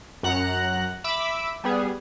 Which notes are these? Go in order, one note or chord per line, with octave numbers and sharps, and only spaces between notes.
F#2 F#5 A#5 F#6
E5 B5 D6 E6
G3 B3 G#4